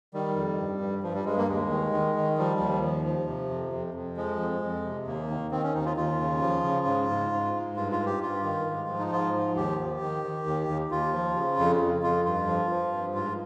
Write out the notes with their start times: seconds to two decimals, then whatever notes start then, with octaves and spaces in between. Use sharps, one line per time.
0.14 D#3 G3
0.36 F2
0.58 G2
0.81 G2
1.03 G2 F3
1.15 G3
1.25 G2 G#3
1.37 A#3
1.48 D#2 G#3
1.71 D#3
1.92 D#3
2.15 D#3
2.38 F3 G3
2.60 D#2
2.83 F3
3.05 F3
3.27 C3
3.50 F2
3.73 F2
3.94 F2
4.17 F3 G#3
4.40 F2
4.62 F2
4.85 C3
5.07 D#2 A#3
5.30 D#3
5.51 D#3 C4
5.63 C#4
5.75 D#2 D#4
5.85 F4
5.97 D#2 F4
6.20 C#3
6.42 F3
6.64 C#3
6.86 G#2
7.09 G#2
7.32 G#2
7.54 G#2
7.76 G2 F4
7.92 F4
8.00 G2
8.06 G4
8.21 G2 F4
8.43 D#3
8.66 G#2
8.89 F3
8.99 D#4
9.11 G#2 F4
9.33 F3
9.56 D#2 G4
9.79 D#3
10.01 D#3
10.24 D#3
10.46 D#2
10.68 D#2
10.91 D#2 F4
11.13 F3
11.36 C#3
11.59 F2
11.81 F2
12.03 F2 F4
12.25 G2 F4
12.47 F3
12.71 F3
12.93 G2
13.15 G#2 F4